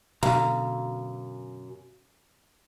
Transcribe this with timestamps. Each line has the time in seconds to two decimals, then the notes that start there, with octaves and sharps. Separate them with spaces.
0.23 F#2 B2 D3 F5 A#5